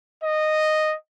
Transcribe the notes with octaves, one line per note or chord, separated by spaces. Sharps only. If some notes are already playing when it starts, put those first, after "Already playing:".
D#5